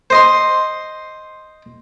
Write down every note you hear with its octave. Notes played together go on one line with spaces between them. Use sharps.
C5 D#5 C6